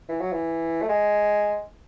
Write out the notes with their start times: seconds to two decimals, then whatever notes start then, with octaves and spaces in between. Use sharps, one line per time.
0.09 E3
0.20 F#3
0.32 E3
0.82 A3
0.89 G#3